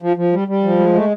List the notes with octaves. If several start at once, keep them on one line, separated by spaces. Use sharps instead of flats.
F3
F3
G3
G3
F3
G#3
A3